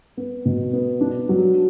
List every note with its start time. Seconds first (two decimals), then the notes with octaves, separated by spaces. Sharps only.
0.17 B3
0.45 B2
0.73 B3
1.01 D4
1.29 F#3